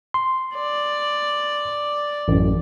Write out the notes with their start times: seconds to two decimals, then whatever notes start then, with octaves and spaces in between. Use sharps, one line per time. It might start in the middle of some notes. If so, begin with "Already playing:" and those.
0.14 C6
0.56 D5
2.28 A1 F#2